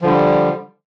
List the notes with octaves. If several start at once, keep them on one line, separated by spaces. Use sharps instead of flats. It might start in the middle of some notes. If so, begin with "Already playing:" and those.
D3 F3 G3